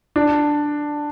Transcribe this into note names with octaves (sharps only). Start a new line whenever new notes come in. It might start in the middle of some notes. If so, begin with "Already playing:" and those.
D4